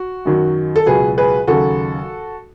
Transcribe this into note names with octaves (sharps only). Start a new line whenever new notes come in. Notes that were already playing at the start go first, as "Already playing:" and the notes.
Already playing: F#4
F#2 D#3 F#3
A4
C#2 B2 F#3 G#4 B4
G#4 B4
D#2 C#3 F#3 F#4 A4